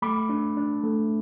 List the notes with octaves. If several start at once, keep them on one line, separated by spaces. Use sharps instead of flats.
A3 B5 D6
D4
D4
A3